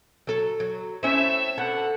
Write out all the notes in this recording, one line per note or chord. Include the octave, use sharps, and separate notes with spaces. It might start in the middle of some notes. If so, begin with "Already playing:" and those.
F#3 A4
F#3
A2 C4 C#4 E5
B2 D3 A4 F#5